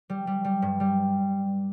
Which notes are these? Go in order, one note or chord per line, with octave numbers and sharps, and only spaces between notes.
G3
G3
G3
G2
G3